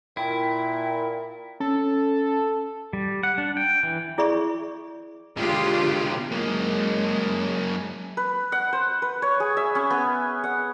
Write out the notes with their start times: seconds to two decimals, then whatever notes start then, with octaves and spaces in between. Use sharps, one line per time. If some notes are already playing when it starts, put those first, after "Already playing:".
0.17 A#2 E4 G5
1.60 C#4 A4
2.93 G3
3.23 F#5
3.38 D4
3.57 G5
3.83 E3
4.18 E4 G#4 D5 E5 B5 C#6
5.37 B2 D3 G#3 F4 G4
6.32 F#2 G#3 A#3
8.17 B4
8.52 F#5
8.73 C5
9.02 B4
9.22 C#5
9.40 G#4
9.57 E5
9.75 C#4
9.90 B3
10.44 F#5